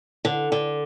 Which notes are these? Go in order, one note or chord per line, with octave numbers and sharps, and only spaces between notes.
D3
D3